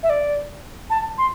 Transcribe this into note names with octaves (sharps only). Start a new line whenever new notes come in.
E5
D5
A5
C6